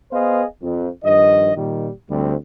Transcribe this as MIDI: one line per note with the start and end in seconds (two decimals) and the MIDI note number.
0.12 0.43 59
0.12 0.43 68
0.12 0.43 71
0.12 0.43 72
0.12 0.43 75
0.12 0.43 77
0.61 0.87 41
1.04 1.51 43
1.04 1.51 51
1.04 1.51 53
1.04 1.51 75
1.55 1.88 46
1.55 1.88 51
1.55 1.88 55
2.09 2.33 38
2.09 2.33 55
2.09 2.33 60